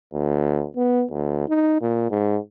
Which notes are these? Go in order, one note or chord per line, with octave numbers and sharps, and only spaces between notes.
D2
B3
D2
D#4
A#2
G#2